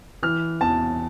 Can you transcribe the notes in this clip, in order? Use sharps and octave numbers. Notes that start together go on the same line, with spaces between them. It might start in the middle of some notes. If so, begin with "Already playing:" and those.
E3 F6
E2 A5